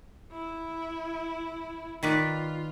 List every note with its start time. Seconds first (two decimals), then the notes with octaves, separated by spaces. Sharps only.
0.32 E4
2.03 D#3 F4 B4 D5